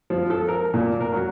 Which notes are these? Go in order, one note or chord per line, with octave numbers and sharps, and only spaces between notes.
F3
A4
A#4
A#2
A#4
F#3